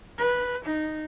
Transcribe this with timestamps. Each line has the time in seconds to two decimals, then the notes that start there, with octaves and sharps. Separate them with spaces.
0.18 B4
0.64 D#4